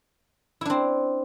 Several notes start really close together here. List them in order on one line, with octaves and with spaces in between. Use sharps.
E4 D4 C4